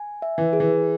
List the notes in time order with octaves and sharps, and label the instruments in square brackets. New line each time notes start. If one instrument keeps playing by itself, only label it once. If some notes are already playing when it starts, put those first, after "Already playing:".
Already playing: [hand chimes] G#5
E5
[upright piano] E3
[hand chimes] G#4
[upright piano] E3